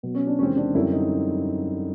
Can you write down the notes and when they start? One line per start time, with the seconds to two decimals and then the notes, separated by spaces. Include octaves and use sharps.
0.03 B2 F#3 B3
0.15 C#4
0.27 D4
0.39 E2 C3 D#3 G#3 C4 C#4
0.57 D4
0.74 F#2 D3 G3 C4 E4
0.93 D#4